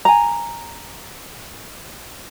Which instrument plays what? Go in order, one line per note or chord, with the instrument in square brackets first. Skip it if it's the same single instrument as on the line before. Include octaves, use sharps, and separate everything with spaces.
[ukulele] G#5 A#5